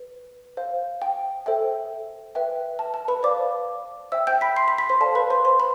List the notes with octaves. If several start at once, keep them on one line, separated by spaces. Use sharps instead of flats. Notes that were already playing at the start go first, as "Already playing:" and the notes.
Already playing: B4
C5 F5
G5
A4 C5 E5 G5
B4 E5 G5
A5
A5
B4 B5
C5 D5 F5 D6
C5 E5 G5 E6
G5 G6
B5 B6
C6 C7
B5 B6
B5 B6
C5 C6
A4 D5 F5 A5
B4 B5
C5 C6
C5 C6
B5